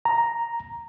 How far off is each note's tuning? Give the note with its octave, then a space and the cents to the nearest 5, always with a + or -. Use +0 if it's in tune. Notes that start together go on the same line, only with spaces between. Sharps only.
A#5 +0